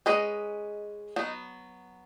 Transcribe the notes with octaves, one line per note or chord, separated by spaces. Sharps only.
G#3 C#4 B4 D#5
F#3 B3 D#4